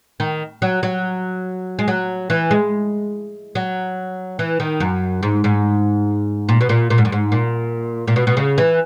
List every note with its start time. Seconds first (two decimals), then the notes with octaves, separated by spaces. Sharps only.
0.20 D#3
0.62 F#3
0.83 F#3
1.79 G#3
1.88 F#3
2.30 E3
2.51 G#3
3.55 F#3
4.39 E3
4.60 D#3
4.80 F#2
5.23 G#2
5.44 G#2
6.49 A#2
6.61 B2
6.69 A#2
6.90 A#2
6.98 G#2
7.05 F#2
7.12 G#2
7.32 A#2
8.07 A#2
8.16 B2
8.27 B2
8.37 C#3
8.58 E3